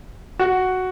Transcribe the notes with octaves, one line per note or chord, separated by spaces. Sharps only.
F#4